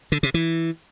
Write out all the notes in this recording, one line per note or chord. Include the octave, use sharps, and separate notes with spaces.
D3
C3
E3